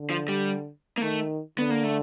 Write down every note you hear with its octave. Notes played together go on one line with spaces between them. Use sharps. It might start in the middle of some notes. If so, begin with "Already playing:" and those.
Already playing: D3
F3
G3
A#3
D#3 A3
D3 B3
A#3
A3